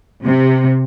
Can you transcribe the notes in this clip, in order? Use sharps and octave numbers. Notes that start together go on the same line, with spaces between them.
C3